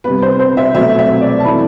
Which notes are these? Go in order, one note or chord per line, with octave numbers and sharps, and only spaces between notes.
C3 G3 B3 B4
C5
C5
E5
B2 F#3 A3 C4 E5
E5
D5
A5
E3 A3 C4 B5